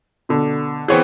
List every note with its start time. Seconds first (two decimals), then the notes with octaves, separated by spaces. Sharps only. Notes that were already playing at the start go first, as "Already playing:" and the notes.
0.29 B2 D3
0.88 E3 B3 C4 G#4 C#5